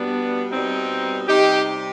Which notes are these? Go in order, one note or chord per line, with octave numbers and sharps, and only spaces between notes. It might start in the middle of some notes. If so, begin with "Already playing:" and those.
Already playing: B2 G3 B3 D4
B2 G3 C4 D#4
C3 G3 D#4 G4